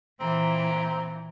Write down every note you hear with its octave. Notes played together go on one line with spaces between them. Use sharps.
A#2 E3 C4 A#5